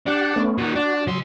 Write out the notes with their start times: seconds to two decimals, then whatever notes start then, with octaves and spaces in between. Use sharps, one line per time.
0.07 D4 G4 F#5
0.36 A3 B3 C#4
0.58 A#2 D#3 F#4
0.76 D4
1.07 C#3 F#3 C6